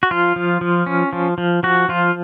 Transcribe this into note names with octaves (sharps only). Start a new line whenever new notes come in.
F#4
F3 F4
F3
F3
C#4
F3
F3
F3 F#4
F3 F4